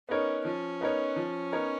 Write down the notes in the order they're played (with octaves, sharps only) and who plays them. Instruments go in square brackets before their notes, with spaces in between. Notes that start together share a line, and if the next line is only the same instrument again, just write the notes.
[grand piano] B3 D#4 A#4 C#5 [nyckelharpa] C#4
[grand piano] F3 [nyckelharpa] C#4
[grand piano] B3 D#4 A#4 C#5
F3
B3 D#4 A#4 C#5